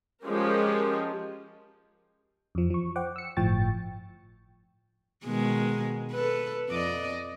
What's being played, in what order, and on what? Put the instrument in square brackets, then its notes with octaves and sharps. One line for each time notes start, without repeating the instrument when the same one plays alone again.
[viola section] F3 G#3 C#4 G4 A#4
[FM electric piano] F2 F3
F3 C#6
C5 F#5 G5 D6
E6 C#7
G1 A2 F3 G5 C#6 A6
[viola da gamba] B2 D#3 G#3
A4 B4
F2 D5 D#5